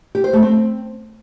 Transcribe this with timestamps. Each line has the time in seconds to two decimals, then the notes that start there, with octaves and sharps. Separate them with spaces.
0.15 G4
0.24 C5
0.33 A3
0.43 C4